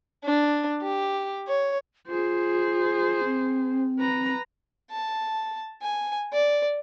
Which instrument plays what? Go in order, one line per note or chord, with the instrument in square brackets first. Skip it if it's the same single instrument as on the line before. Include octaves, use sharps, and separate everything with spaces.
[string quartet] D4
G4
C#5
[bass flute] F4 [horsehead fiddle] G#4 C5
[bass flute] C4
[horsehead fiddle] B4 A#5
[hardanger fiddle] A5
G#5
D5